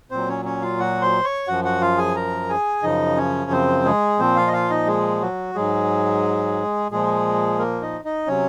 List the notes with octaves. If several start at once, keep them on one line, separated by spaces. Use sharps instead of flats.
A#2 F#3 C4 C5
C#4 C#5
C#4 C#5
F4 F5
F#4 F#5
C5 C6
C#5 C#6
F#2 F3 F#4 F#5
F#4 F#5
F4 F5
G#4 G#5
A#4 A#5
G#4 G#5
F#2 C#3 F3 D#4 D#5
C#4 C#5
C4 C5
G#3 G#4
A#2 F3 C4 C5
F4 F5
D#5
F4 F5
D#4 D#5
G#3 G#4
F#3 F#4
G#2 F#3 G#3 G#4
A#2 F3 G#3 G#4
A#3 A#4
D#4 D#5
D#4 D#5
C3 F#3 C#4 C#5